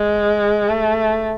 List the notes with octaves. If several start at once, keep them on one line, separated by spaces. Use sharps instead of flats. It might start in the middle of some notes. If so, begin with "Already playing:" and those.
Already playing: G#3
A3